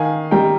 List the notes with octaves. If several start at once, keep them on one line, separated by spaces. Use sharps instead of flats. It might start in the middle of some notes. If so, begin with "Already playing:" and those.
Already playing: D#3 F5 G#5
G3 G5 A#5